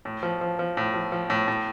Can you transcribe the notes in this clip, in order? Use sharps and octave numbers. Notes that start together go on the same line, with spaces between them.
A2
F3
F3
F3
A2
F3
F3
A2
A2